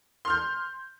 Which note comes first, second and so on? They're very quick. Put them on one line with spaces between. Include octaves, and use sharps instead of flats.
C6 F6 G6